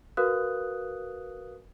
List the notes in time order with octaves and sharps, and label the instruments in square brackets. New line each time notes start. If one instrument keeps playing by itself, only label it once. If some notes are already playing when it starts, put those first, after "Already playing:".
[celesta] F#4 A#4 B4 F5 D#6 F#6